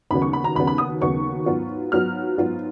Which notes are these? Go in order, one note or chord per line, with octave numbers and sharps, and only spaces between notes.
D#2 C#3 F#3 B3 B5
C#6
B5
A#5
D#2 C#3 F#3 B3 B5
B5
D#6
D#2 C#3 F#3 B3 C#6
G#2 F#3 B3 F4
G#2 F#3 B3 F4 F6
G#2 F#3 B3 F4